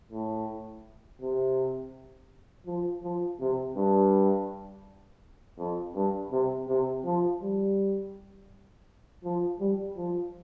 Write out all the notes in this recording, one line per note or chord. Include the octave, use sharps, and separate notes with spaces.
A2
C3
F3
F3
C3
G2
F2
G2
C3
C3
F3
G3
F3
G3
F3